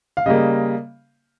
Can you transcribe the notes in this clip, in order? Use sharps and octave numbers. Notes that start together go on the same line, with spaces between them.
F5
C#3 G3 A#3 D#5